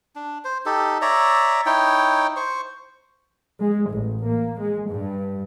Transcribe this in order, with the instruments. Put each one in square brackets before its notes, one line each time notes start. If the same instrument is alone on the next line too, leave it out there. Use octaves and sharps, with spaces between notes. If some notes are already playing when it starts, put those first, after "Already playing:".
[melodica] D4
C5
D#4 G4 A4
C#5 D5 E5 A#5
D#4 E4 C#5 G5
C5 C#6
[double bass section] G#3
A1
A#3
G#3
G2